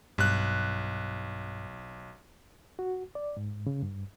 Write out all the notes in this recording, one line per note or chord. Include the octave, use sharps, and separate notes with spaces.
B1 G2 F#6
F#4
D5
G#2
C#3
G2